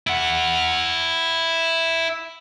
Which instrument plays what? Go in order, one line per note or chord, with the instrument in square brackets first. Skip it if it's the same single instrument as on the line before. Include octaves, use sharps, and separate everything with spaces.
[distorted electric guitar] E4 F#5